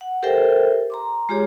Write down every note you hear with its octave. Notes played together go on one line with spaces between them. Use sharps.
F#5
G4 A4 A#4 C5 E5 G5
A#5 C6 D6
G#3 F4 G4 G#4 C#5